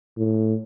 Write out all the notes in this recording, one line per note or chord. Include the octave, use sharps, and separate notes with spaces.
A2